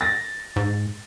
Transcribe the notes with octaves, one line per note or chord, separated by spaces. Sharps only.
A6 A#6
G#2